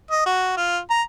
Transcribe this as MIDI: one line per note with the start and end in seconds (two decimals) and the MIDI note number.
0.11 0.23 75
0.26 0.55 66
0.57 0.79 65
0.90 1.02 82